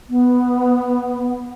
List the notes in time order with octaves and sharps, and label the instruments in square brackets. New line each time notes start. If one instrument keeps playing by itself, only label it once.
[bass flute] B3